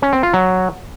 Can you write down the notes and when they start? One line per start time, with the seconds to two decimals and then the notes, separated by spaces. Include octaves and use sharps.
0.02 C#4
0.13 C4
0.23 F4
0.33 F#3